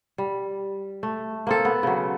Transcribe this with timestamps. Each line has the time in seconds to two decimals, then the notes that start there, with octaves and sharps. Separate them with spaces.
0.18 G3
1.03 A3
1.47 A#3 C4 A4
1.65 B3
1.83 C#3 F#3